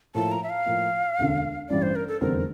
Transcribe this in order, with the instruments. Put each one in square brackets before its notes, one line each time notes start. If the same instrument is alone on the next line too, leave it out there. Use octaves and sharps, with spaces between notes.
[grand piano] A2 F3 A#3 E4 [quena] A5
[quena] A#5
E5
F5
[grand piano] A2 F3 A#3
E1 D2 D3
[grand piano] A1 G2 E3 G3 [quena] D5
[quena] C5
A#4
A4
[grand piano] F1 E2 D3 G3 C4 [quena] A#4